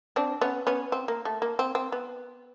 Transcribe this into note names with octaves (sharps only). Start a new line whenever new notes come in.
C4 D4
B3 C#4
B3 C#4
C4
A#3
A3
A#3
C4
C4
B3